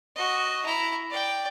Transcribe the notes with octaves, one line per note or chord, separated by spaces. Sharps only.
F#4 D#5
E4 A#5
D5 G5